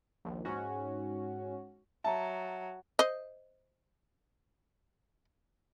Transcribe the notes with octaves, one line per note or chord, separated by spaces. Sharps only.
A#1 D#2
G#2 C#4 F#4
F#3 E5 A5 A#5
C5 D#5